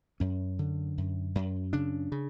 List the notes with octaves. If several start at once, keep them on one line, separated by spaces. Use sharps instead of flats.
F#2 C#4
D3
F#2
F#2
C#3 D4
C#3